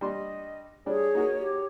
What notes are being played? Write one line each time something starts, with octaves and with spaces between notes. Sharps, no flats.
G3 D4 D#5 C6
G3 D4 G#4 C#5
D#4 F#4 A#4
G4